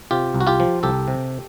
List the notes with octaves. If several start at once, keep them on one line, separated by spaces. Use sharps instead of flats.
C3 F4 G4
C2
F#4
F4 G4
F3
C2 G4 A4
C3